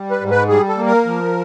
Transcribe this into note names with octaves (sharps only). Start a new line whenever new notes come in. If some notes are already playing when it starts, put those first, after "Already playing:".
Already playing: G3
B4
G#2
B4
G3 G#4
A4
A#3
A#4
F3